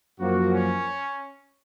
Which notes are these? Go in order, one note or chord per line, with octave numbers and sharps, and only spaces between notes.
F#2 F3 A#3 F#4
C#4